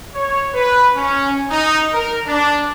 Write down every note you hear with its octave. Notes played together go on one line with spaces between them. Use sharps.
C#5
B4
C#4
D#4
A#4
D4